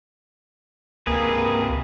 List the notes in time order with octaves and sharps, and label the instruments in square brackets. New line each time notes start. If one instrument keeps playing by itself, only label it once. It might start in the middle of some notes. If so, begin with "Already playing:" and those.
[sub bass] C#2 [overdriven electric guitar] C3 B4 [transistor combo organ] A#3 [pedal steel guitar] G#4